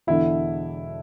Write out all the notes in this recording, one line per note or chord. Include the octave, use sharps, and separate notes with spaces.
E1 E2 D3 E4